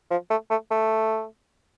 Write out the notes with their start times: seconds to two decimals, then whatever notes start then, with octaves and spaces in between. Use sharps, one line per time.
0.11 F3
0.30 A3
0.50 A3
0.71 A3